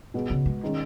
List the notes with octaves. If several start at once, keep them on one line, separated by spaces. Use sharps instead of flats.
B2 B3 G#4
C#3
G#3
D#3 G#3 C#4